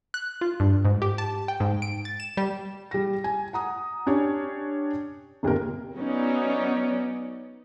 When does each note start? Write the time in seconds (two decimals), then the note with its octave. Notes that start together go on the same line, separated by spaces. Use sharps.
0.14 F#6
0.41 F4
0.60 G2
0.85 G#2
1.02 G4
1.18 A5
1.48 G5
1.60 G#2
1.82 D7
2.05 A6
2.20 E7
2.37 G3
2.91 G3 A#6
3.24 G#5
3.53 F#5 A#5 D#6
4.06 C#4 D4 G4 C#5
5.43 G1 D#2 C3 A#4
5.98 F#3 B3 C#4 D#4 D5